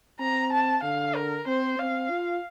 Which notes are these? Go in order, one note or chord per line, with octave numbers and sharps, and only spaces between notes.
C4 A#5
A5
D3 F5
A#4
C4 C5
C4 F5
F4